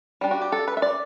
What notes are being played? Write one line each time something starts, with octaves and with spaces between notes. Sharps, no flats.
G3 D4
F#4
G4
A4
B4
E5
D5